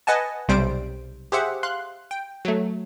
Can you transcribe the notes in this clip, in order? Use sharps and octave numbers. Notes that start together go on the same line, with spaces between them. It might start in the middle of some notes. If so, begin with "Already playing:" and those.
B4 D#5 F#5 G#5 A5
B1 C3 G3 C5 D7
G4 G#4 C5 E5 F#5
F5 C6 F#6
G5
F#3 A3